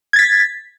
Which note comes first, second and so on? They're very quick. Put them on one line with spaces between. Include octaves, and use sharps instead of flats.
G#6 A6 B6